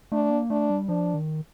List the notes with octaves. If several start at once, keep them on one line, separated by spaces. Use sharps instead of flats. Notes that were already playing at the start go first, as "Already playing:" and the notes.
A3 D4
A#3
A3 D4
G3
F3 D4
D#3